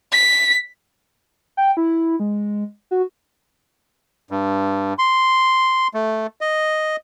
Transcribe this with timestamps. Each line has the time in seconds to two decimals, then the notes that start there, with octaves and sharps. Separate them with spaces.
0.12 B6
1.57 G5
1.77 E4
2.20 G#3
2.91 F#4
4.31 G2
4.99 C6
5.94 A3
6.41 D#5